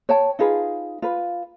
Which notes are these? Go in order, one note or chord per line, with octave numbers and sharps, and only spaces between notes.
C#5 G5 A5
D#4 F4 G#4 B4
F4 B4